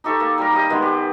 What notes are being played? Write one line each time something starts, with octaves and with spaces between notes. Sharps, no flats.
D#4 G4 A4 C#6
A#3
G3 A#4
G4 D#5
D#3 G#3 B3 G#4
G4